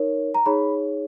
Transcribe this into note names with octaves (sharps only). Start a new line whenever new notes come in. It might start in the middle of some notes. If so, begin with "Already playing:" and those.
Already playing: D#4 A#4 C#5
A#5
D#4 G#4 C#5 B5